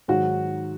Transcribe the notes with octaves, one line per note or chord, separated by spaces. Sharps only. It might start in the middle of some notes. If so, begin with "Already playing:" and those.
G#2 D#3 F#3 F#4